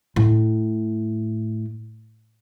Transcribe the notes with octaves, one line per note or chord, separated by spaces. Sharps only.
A2